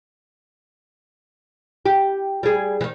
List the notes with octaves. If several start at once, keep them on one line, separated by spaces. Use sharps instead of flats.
G4
G3 G#4
D#3 E3